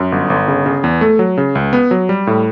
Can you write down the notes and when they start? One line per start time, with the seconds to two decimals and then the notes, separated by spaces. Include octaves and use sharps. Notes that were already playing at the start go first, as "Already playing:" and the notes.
Already playing: F#2
0.12 G1
0.30 G1
0.48 C#3
0.66 C#3
0.84 E2
1.01 A3
1.19 F#3
1.38 C#3
1.55 C#2
1.73 B3
1.91 F#3
2.09 G3
2.27 A2